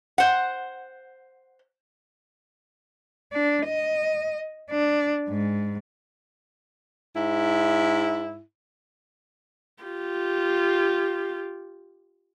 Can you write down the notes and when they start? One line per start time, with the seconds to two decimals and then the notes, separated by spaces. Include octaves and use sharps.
0.18 C5 F#5
3.32 D4
3.66 D#5
4.70 D4
5.28 G#2
7.16 G#2 E4
9.83 F4 G4